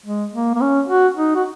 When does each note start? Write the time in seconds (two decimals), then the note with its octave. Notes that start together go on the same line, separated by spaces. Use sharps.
0.06 G#3
0.34 A#3
0.55 A#3
0.61 C#4
0.89 F#4
1.16 D#4
1.35 F#4